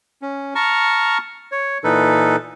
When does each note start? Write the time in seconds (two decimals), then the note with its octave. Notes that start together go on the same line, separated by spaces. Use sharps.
0.22 C#4
0.55 A5 A#5 C#6 F6
1.52 C#5
1.84 A#2 E3 D#4 A4 B4